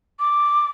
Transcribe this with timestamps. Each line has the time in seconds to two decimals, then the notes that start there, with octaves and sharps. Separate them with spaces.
0.19 D6